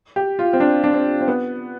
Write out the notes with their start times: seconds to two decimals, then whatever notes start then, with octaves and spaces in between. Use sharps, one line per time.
0.16 G4
0.39 F4
0.53 C4
0.60 D4
0.84 D4
0.94 C4
1.21 C4
1.28 B3